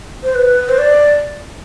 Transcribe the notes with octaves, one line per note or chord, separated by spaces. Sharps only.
C5
B4
C5
D5